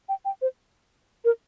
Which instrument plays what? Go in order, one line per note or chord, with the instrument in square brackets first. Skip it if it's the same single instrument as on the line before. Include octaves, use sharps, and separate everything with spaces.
[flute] G5
G5
C5
A#4